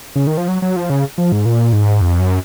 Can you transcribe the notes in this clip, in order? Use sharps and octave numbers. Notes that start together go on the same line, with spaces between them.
C#3
D#3
F3
F#3
F#3
F3
C#3
F3
G#2
A#2
G#2
F2
F#2